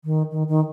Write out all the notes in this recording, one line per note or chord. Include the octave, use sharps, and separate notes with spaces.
D#3
D#3
D#3